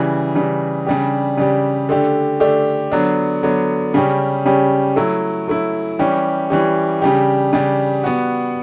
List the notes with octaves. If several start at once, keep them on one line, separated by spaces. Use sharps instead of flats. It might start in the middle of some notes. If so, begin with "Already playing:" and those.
Already playing: C#3 E3 G3
C#3 E3 G3
C#3 G3 D4 G4
C#3 G3 D4 G4
D3 A3 D4 G4
D3 A3 D4 G4
D3 F#3 B3 D4
D3 F#3 B3 D4
C#3 G3 C#4 G4
C#3 G3 C#4 G4
F#3 A3 E4
F#3 A3 E4
E3 G3 C#4 G4
E3 G3 C#4 G4
C#3 G3 D4 G4
C#3 G3 D4 G4
G3 B3 F#4